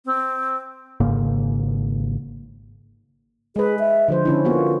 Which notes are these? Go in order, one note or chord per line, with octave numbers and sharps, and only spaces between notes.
C4
G#1 G#2 C#3 A#3
G#3 G#4 B4
E5
D3 F3 C5
D3 C#4 D4 E4
A#3 B3 F4 F#4